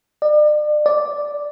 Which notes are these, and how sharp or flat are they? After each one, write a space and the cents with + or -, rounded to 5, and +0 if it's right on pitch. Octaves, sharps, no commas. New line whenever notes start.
D5 +40
D5 +0